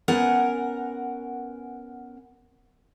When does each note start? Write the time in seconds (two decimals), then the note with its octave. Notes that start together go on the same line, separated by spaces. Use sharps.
0.08 B3 C#4 A#4 F#5 G#5